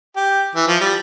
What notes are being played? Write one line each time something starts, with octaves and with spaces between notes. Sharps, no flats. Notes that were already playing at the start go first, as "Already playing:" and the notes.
G4
E3
F3
G3